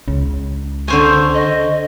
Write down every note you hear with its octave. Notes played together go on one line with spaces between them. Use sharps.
C#2 C#3
D3 C5 G#5 C#6
D#5